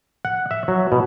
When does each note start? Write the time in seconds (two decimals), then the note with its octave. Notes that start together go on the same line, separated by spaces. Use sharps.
0.25 F#5
0.51 E5
0.68 F#3
0.92 B2